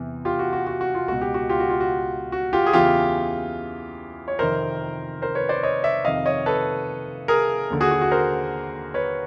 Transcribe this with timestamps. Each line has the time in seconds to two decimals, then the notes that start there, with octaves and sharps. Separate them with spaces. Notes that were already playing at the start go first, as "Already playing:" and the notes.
Already playing: E2 C3 E3
0.25 F4 G4
0.39 F#4
0.53 F#4
0.67 F#4
0.81 F#4
0.95 F4
1.08 C#2 B2 F#4
1.21 G4
1.34 F#4
1.49 F4 G4
1.60 F#4
1.70 F4
1.80 F#4
2.32 F#4
2.53 F4 G4
2.66 G#4
2.73 E2 C#3 E3 F4 G4
4.28 C#5
4.39 F2 C3 D#3 A#4 C5
5.22 A#4 C5
5.35 B4 C#5
5.49 C5 D5
5.63 C#5 D#5
5.84 D5 E5
6.05 F2 C3 D#3 D#5 F5
6.26 C#5 D#5
6.46 A4 B4
7.28 G#4 A#4
7.70 D#2 D3
7.81 F#4 G#4
7.91 F#4
8.01 F#4
8.11 A#4 C5
8.94 B4 C#5